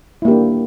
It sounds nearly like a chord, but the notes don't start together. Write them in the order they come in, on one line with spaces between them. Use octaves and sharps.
E4 A#3 G4 D4